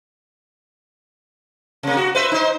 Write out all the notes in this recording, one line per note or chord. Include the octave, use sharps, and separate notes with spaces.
C3 A#3
F#4
B4 C5 E5
D#4 C5